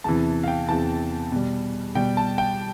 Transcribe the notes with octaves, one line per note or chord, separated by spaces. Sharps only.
E2 C3 E3 A5
F5
G5
E2 C3 E3 A5
B2 G3
B2 G3 G5
A5
G5